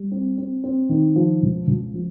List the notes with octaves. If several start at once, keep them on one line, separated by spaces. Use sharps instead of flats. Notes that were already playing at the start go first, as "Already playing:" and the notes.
Already playing: G3
C4
C4
C4
D#3
F3
C#2
C#2
F3